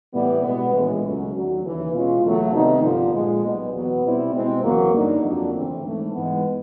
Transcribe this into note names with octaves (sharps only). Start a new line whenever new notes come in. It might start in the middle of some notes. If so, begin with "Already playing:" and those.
A2 E3 G3 B3
B2 G#3 B3
A#1 A2 E3 G#3
C#2 B2 F#3 A3 C#4
D#2 D3 F#3
D#2 C#3 E3
B2 G#3 C#4 F4 G#4
E2 C#3 F#3 A3
C3 D#3 G3 B3 D#4
G1 G2 D3 F3
A#2 F3 G#3
B1 B2 G3 B3
E2 B2 F#3 B3
B2 G3 C4 E4
B2 G#3 C4
E2 C#3 F#3 A#3
G2 D3 G3 A#3 D#4
F2 D3 F#3 A#3 D4
D2 C#3 E3 A3 C4
G#2 E3 A3
G#2 E3 G#3 B3